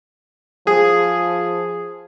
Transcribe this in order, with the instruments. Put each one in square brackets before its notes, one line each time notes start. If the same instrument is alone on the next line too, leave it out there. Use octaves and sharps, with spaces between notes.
[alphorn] F3 [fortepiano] G#4